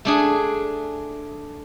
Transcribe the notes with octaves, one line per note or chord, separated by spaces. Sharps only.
A3 D4 G#4